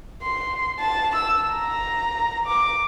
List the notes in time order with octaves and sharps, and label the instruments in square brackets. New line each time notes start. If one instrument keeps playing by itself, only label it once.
[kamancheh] C6
A5
E6
A#5
D6